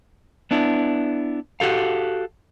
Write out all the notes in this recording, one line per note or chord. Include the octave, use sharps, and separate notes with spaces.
B3 D4 E4
F#4 G4 A4 F5